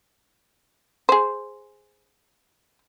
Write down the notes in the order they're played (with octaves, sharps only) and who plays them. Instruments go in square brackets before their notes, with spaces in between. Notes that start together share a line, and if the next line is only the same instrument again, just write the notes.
[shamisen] G#4 C5